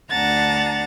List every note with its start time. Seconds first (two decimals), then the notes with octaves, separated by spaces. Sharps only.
0.11 D2 D4 F#5 A5 A#5 A6